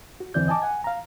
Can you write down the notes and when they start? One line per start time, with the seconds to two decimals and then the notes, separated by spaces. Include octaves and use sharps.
0.20 F#4
0.34 E2 D3 E3 C4 D5 G6
0.48 D#5 G#5 A5 D6
0.62 F#5 G#5
0.84 F5 A#5